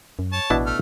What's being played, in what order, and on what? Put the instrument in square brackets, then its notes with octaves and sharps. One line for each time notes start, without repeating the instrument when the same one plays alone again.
[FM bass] F#2
[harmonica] C#5 A5
[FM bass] A1 [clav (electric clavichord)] B2 D4 E4
[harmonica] A3 F6